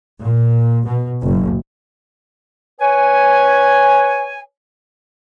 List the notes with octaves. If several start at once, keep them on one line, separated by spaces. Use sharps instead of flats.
A#2
B2
F#1
B4 C#5 G#5